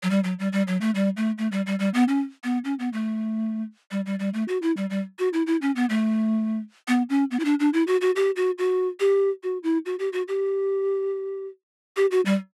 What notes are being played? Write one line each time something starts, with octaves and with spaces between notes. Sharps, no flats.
F#3
G3
F#3
G3
G3
F#3
A3
G3
A3
A3
G3
G3
G3
B3
C#4
B3
C#4
B3
A3
G3
G3
G3
A3
F#4
E4
G3
G3
F#4
E4
E4
C#4
B3
A3
B3
C#4
B3
E4
D4
D4
E4
F#4
F#4
G4
F#4
F#4
G4
F#4
E4
F#4
G4
F#4
G4
G4
F#4
G3